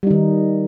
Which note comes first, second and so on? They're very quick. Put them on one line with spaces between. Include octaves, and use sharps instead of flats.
G3 D#4 D#3